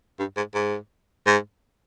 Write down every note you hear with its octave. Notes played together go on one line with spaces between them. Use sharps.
G2
G#2
G#2
G#2